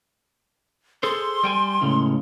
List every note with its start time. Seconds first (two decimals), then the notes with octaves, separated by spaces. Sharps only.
1.03 G#4 A4 C5 C6
1.43 G3 G5 G#5
1.82 C#2 A2 C#3